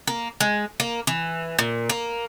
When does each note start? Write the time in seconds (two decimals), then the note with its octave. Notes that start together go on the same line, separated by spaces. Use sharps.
0.07 A#3
0.41 G#3
0.80 A#3
1.07 E3
1.59 A#2
1.90 A#3